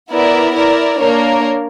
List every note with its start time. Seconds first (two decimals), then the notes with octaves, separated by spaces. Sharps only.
0.11 B3 E4 A#4 D5
0.55 E4 A#4 D5
0.99 A#3 D4 A#4 C#5